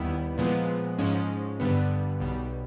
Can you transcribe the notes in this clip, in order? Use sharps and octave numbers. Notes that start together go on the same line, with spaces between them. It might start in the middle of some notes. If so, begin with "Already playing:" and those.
Already playing: D#2 D#3 G3 B3 E4
A#2 F3 G#3 B3
G#2 F3 G#3 C#4
G2 D3 G3 B3
B1 B2 G3